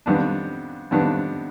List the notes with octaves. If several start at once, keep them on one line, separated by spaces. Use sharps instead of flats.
F2 D#3 G3 B3 D4
F2 D#3 G3 B3 D4